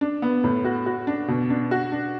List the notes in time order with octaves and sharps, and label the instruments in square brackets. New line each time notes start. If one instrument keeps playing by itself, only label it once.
[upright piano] D4
B3
A2
F#4
F#4
D4
B2
D4
F#4
D4